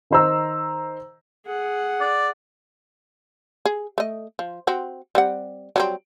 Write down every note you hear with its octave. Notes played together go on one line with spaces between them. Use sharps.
D#3 D#4 C5 A#5 E6
G#4 F#5
D5
G#4
A3 D#5
F3
C4 F#4
G3 C4 F#5
F#3 G3 C4